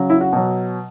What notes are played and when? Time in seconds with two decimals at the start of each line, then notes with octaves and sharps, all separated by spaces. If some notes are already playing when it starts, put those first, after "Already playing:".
Already playing: C#3 F#3
0.10 E4
0.21 F#4
0.33 B2 F#3